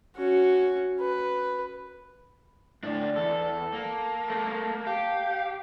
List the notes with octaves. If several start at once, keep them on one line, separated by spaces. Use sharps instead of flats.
C#4 F#4
B4
D2 A2 D4 D5
E2 A4
A#3 A5
A3 A4 A#4
G4 F5